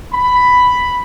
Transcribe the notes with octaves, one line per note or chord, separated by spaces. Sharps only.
B5